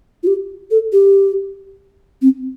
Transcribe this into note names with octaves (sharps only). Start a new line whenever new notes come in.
F4
G4
A4
G4
C4